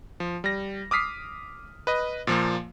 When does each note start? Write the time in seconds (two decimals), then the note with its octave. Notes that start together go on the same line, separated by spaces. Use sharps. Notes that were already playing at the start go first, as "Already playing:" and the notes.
0.20 F3
0.44 G3 A#6
0.91 D6 D#6 F6 B6 C7
1.87 B4 D#5
2.27 A#2 F3 A#3